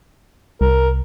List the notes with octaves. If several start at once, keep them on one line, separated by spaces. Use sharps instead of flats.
C2 A#4